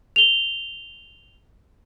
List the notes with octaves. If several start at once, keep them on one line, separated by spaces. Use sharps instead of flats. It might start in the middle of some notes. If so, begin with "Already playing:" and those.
F7 G7